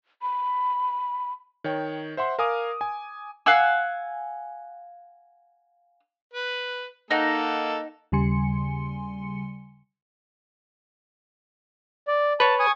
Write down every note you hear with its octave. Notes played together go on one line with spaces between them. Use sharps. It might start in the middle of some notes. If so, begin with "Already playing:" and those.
B5
D#3 C#5 G5
C5 E5 F#5 C6
A#4 F5 G#5 D6 D#6
G#5
F5 F#5 G#5 E6
B4
A#3 D#4 A4 F#5
D#2 C#3 G3 G#5 C6 C#7
D5
B4 C#5 A5
G#5 C#6 D#6